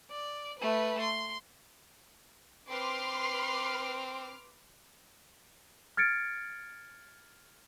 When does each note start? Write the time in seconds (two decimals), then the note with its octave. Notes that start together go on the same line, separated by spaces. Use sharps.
0.11 D5
0.59 A3 B4
1.00 C6
2.69 C4 B4 C6 D6 F6
5.97 F6 G#6 A6 C#7 D7